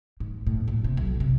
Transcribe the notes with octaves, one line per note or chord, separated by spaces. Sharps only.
G#2
A2
A#2
C3
B1
C3